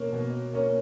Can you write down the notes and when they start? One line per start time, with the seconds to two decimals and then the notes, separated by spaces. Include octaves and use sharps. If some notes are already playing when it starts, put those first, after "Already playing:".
Already playing: B2 A#3 C#4
0.13 B2
0.53 A#3 C#4